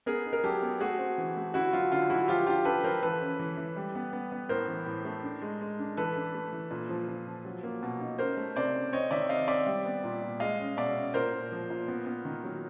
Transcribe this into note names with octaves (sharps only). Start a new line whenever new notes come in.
B3 G#4 A#4
D#4
A#4
F#3 G4 A4
B3
A3 F#4 G#4
C4
E3
A3
D3 E4 F#4
F#3 F4
D3 F4
F#3 E4 F#4
F3 F4 G4
D4 F4 G4
D4 A4 B4
F3 A#4 C5
E3 A4 B4
C#4
E3
E3
G3
B3
B3
B3
A2 A#4 C5
E3
A2
A3
D4
G#3
G#3
D4
E3 A4 B4
D4
A3
E3
A#2
F3
F3
F3
F#3
A#3
B2
D#4
C#4 A#4 C5
A3
C3 C5 D5
C#4
C4 C#5 D#5
D#3 D5 E5
C3 D#5 F5
C4 D5 E5
G3
B3
A#2
A#2
G#3 D#5 F5
C#4
B2 D5 E5
C#4
A#2 A#4 C5
A#2
F3
A#2
B3
B3
D#3
F#3